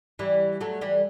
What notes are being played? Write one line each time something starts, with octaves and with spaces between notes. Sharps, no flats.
E3 G3
F#3 A3
E3 G3